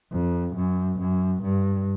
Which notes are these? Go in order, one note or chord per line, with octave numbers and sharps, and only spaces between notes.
F2
F#2
F#2
G2